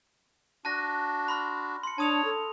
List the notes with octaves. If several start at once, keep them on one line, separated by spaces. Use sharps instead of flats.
D4 F#4 A5 F#6 A#6
B5 C6 F6
C6 C#7
D4 C#5 A5 D#6 F7
A4